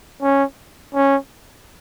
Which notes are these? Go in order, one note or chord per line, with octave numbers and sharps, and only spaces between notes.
C#4
C#4